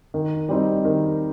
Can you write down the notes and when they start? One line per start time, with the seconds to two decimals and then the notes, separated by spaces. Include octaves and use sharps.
0.14 D#3
0.49 G3 C4 D#4
0.85 D#3